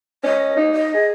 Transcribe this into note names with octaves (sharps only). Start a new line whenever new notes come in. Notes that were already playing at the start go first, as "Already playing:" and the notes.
C#4 D#5
D#4
D#5
G#4